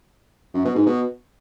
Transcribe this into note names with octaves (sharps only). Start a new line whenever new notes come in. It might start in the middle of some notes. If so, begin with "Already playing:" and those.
F#2
B2
G#2
B2